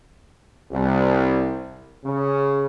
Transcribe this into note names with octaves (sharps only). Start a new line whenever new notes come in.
C2
C#3